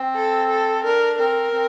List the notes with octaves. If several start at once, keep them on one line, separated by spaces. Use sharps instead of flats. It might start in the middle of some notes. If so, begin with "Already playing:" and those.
Already playing: C4
A4
A4
D4 A#4
C4 A#4
C4